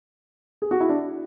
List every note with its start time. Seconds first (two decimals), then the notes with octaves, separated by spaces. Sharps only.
0.62 G#4
0.71 F#4
0.80 E4
0.89 D4